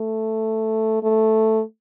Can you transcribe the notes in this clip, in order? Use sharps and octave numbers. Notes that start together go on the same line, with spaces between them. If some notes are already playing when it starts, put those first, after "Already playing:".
Already playing: A3
A3